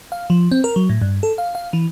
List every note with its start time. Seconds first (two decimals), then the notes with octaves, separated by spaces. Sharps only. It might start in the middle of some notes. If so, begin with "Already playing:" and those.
0.12 F5
0.30 F3
0.51 C4
0.64 A#4
0.76 F#3
0.89 A2
1.02 G2
1.23 A4
1.38 F5
1.55 F5
1.73 E3